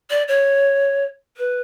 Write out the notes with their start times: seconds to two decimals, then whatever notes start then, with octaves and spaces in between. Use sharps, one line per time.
0.10 D5
0.28 C#5
1.37 B4